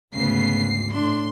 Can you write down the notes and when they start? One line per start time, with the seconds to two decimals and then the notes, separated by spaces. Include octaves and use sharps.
0.14 G#1 D2 C#3 B3 C7
0.93 A2 A3 D4 C6